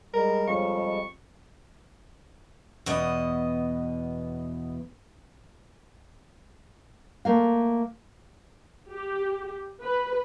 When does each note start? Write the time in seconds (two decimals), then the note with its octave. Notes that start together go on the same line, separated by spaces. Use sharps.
0.13 G3 G#3 A#4
0.47 F2 C5 C#5 F5 C#6
2.86 E2 B2 D#5
7.25 A3 A#3 F5
8.88 G4
9.82 B4